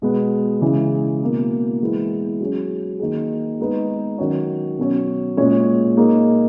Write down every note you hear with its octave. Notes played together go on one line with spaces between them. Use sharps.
B2 G#3 B3
C#3 E3 G#3
B2 A#3 E4
E3 G#3 B3 E4
F#3 C#4 G#4
D#3 A#3 D#4 G#4
G#3 B3 D#4 G#4 B4
D#3 F#3 C#4 F#4 C#5
B2 F#3 C#4
A#2 G#3 C#4 G#4 C#5
A#3 D#4 G#4